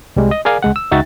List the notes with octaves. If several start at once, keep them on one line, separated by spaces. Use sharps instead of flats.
C2 G3 G#3
D#5
G#4 A#4 D5 F5 G#5
C#2 G#3 F#5
E6
C#2 D#4 F#4 E5 G5 A6